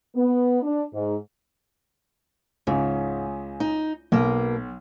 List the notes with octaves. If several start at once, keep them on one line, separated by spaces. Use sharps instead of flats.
B3
D4
G#2
C#2 G#2 C#3
D#4
B1 B2 A#3